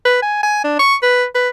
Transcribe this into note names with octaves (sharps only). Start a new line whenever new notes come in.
B4
G#5
G#5
D4
C#6
B4
B4